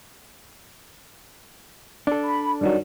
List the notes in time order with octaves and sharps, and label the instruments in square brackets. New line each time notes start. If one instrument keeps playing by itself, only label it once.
[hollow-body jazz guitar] D4 A4
[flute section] B5
[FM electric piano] G2 D#3 F#3 [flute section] D5